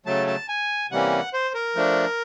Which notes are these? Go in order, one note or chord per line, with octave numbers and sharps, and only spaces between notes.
C#3 F#3 A3 A5
A5
G#5
C3 E3 G3 A#3 C#4 F#5
C5
A#4
F3 A3 D4